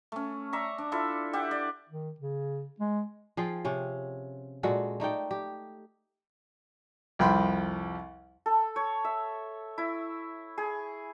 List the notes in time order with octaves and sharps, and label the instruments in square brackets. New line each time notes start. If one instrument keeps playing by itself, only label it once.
[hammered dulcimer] A3 C#4
D5 E5 A#5 C#6
D4
E4 F4 A4 E5
G4 E5 F#5
D5
[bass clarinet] D#3
C#3
G#3
[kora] F3 F4 G#4 G5
C3 C#4
A#2 G#3 F#4 A4
A3 D#4 D5 G5
G4
[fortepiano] C2 F2 G5 B5 C6
[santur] A4
C#5
E5
E4
G#4